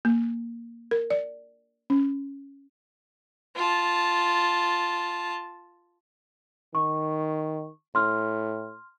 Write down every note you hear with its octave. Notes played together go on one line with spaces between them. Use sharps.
A#3
A#4
D5
C#4
F4 A5
D#3 C#6
A2 C6 F6